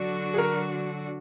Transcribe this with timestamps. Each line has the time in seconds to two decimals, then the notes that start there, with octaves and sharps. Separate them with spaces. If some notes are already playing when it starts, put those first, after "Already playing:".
Already playing: D3 F#3 D4 F#4
0.34 G#4
0.38 A#4